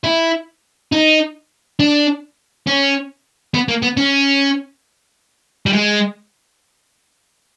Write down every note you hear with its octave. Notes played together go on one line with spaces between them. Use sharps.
E4
D#4
D4
C#4
B3
A#3
B3
C#4
G3
G#3